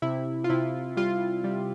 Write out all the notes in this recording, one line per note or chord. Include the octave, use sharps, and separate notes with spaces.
C3 E4
F4
C3 E4
G3 F4
G3